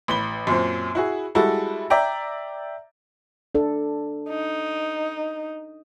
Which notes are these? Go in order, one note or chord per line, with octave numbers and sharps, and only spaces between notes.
A1 B5 G7
F#2 A#2 C4
E4 F#4 G#4
G3 G#3 E4 F#4 A4
D5 E5 G5 A#5
D4 A4
D#4